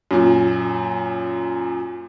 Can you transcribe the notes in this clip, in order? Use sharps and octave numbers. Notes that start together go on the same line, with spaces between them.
F#2 A#2